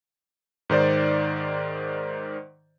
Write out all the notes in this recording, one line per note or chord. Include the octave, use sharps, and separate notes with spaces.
G#2 D#3 C5 D5